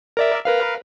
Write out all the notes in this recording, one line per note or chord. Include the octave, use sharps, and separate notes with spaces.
A#4 D5 E5
A#4 B4 F5